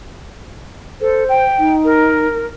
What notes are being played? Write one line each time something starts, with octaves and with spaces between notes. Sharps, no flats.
A4 C5
G5
D#4
A#4